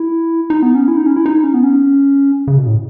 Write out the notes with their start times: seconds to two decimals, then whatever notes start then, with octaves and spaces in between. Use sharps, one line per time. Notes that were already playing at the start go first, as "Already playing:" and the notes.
Already playing: E4
0.50 D#4
0.63 B3
0.75 C#4
0.88 E4
0.97 D#4
1.06 C#4
1.16 E4
1.26 D#4
1.44 C#4
1.54 B3
1.64 C#4
2.47 C#3
2.58 B2
2.67 A2